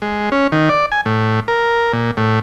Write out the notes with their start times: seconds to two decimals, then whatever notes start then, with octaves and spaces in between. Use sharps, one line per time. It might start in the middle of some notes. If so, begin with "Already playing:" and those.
0.02 G#3
0.32 C#4
0.52 D#3
0.69 D5
0.92 G#5
1.05 A2
1.48 A#4
1.93 A#2
2.17 A2